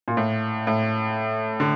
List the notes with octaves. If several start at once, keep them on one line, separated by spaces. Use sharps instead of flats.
A#2
A2
A2
D3